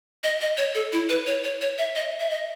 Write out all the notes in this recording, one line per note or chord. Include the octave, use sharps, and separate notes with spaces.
D#5
D#5
C#5
A4
E4
B4
C#5
C#5
C#5
E5
D#5
E5
D#5